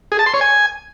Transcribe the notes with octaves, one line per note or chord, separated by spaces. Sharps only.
G#4
A5
C6
C#5
G#5